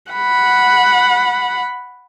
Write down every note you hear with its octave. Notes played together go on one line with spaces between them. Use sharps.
F#5 B5